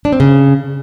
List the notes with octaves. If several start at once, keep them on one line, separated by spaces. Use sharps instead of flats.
D4
C4
C#3